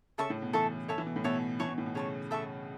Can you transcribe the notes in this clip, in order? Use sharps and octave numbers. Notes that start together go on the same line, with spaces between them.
C#3 A4 E5 A5 C#6
A2
B2
E3 A4 E5 A5 C#6
A3 C#5 E5 A5
E3
B2
A2
B2 C#5 E5 A5
E3 C#5 A5 C#6
B2
A2
B2
C#3 C#5 A5 C#6
A4 E5 A5 C#6